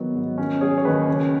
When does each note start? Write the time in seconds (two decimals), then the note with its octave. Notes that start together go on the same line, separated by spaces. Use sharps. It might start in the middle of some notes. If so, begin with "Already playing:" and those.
Already playing: D#3 F#3 B3
0.15 G#2
0.38 D#3 C#4
0.61 F#3 G#4 C#5
0.78 C#5
0.85 D#2 B4 D#5
1.08 C#3